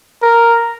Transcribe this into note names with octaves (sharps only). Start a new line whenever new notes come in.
A#4